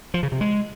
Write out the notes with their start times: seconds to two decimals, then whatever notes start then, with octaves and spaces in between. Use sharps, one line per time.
0.14 F3
0.23 C#3
0.32 C3
0.41 G#3